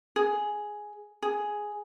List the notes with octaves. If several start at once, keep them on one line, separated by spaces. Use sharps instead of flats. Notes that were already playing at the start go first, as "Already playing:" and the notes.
G#4
G#4